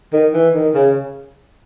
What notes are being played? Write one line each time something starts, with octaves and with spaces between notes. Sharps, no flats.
D#3
E3
D#3
C#3